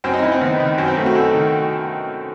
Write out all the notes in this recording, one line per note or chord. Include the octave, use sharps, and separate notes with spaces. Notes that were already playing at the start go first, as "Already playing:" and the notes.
F#2 C4
D#4
F#2 E4
C4
D#3 B3
D#3
F#2
C4
F#2 A3
F#4
F#2 A4
D#3